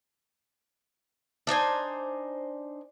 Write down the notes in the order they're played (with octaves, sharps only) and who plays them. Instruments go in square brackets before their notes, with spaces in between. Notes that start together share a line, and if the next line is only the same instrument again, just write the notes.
[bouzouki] D4 D#4 C5 G#5